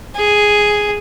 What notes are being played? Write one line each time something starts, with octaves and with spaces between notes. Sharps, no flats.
G#4